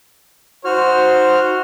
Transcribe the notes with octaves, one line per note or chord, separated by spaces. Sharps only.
D#4 F#4 C5 F6